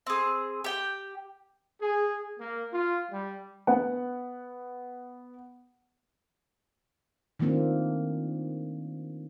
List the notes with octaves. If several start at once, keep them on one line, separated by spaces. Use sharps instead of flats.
C4 G#4
G4 G5
G#4
A#3
F4
G3
B3 F#5
D#3 F3 A3 A#3 C4 D4